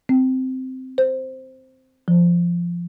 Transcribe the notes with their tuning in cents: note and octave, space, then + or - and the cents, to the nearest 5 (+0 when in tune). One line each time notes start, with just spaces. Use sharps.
C4 -10
C5 +0
F3 -10